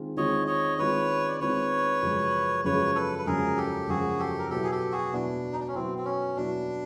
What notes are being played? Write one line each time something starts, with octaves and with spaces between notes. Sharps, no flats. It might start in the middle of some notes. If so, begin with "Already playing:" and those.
Already playing: D#3 G#3 C4 F4
D#3 G#3 C4 F4 C#5 D#5
C#5 D#5
D#3 G#3 C4 F4 B4 C#5
D5
D#3 G#3 C4 F4 B4 C#5
F#2 C#3 F3 G#3
F#2 C#3 F3 G#3 B4 C#5
A4 B4
B4
F#2 C#3 F3 G#3 G#4 A#4
G4 A4
F#2 C#3 F3 G#3 F#4 G#4
G4 A4
A#4
B2 F#3 B3 E4 G4 A4
G#4
G4 A4
F#4 G#4
B2 F#3 B3 D4 E4
D#4
D4
C#4
B2 F#3 B3 C4 E4
C4
C#4
B2 F#3 B3 D4 E4